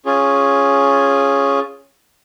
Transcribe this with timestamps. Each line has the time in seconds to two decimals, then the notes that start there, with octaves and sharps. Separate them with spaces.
0.06 C#4 F4 G#4